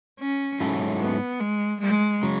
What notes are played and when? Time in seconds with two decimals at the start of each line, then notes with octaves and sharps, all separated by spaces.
0.20 C#4
0.60 G#2 F#3 C#4 E4 A4
1.01 B3
1.40 G#3
1.81 G#3
2.23 C#3 F#3